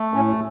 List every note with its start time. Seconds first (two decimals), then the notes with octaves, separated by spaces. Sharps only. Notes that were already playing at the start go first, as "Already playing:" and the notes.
Already playing: A3
0.14 A2 C#4